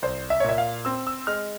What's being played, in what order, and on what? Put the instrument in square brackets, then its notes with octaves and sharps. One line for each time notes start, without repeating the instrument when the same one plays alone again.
[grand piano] C2 C5
E5
C#5
A#2 E5
F5
C4 E6
E6
G#3 F6